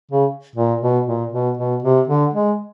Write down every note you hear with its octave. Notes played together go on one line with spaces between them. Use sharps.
C#3
A#2
B2
A#2
B2
B2
C3
D3
G#3